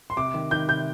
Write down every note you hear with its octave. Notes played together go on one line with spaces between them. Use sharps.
C6
C3 D6
D#3
D#3 G6
C3 G6